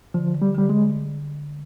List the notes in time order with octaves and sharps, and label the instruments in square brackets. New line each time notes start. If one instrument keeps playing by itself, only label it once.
[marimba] D3 [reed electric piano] F3
[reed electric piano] G3
[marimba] D3 [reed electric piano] G3
[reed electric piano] G#3